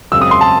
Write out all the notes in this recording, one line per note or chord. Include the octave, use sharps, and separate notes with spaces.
F#2 C#3 G#3 C4 E6
D#6
C6
A5